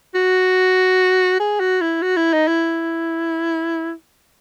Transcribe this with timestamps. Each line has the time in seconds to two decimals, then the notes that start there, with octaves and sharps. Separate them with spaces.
0.15 F#4
1.40 G#4
1.60 F#4
1.81 E4
2.02 F#4
2.17 E4
2.33 D#4
2.48 E4